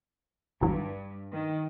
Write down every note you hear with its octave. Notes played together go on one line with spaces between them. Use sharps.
G#1 E2 G2 F#3
D#3